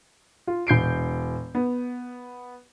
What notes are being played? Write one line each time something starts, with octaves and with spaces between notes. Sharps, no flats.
F4
E1 G6 C7 D7
B3